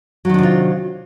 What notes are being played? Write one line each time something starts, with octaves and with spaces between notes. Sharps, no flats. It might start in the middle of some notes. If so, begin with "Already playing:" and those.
C3 D#3 F#3 D4 F4